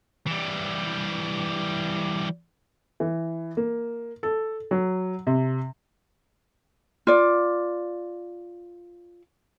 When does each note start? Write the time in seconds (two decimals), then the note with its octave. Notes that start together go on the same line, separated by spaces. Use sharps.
0.27 E3 G3
3.00 E3
3.57 A#3
4.23 A4
4.71 F#3
5.27 C3
7.07 F4 D5